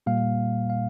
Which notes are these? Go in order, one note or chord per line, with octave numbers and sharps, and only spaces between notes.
A#2 G3 A#3 F5
F5